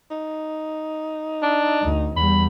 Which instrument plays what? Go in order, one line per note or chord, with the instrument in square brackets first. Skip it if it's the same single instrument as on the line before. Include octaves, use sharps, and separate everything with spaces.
[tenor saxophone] D#4
[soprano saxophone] D4
[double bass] D2
[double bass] E2 G3 [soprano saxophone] B5